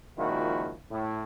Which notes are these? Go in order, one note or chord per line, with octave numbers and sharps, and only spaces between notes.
C#2 A#2 D#3 F3 E4 F#4
A2